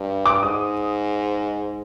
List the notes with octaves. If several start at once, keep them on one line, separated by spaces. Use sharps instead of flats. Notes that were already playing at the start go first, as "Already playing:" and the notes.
Already playing: G2
D6
G#2 D#6